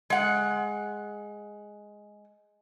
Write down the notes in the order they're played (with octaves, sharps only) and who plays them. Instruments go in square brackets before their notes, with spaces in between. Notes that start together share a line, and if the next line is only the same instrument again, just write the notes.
[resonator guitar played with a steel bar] G#3 F#5